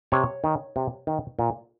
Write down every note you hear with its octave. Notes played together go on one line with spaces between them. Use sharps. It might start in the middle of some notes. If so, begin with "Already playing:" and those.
C3 C#5
D#3
C3
D#3
A#2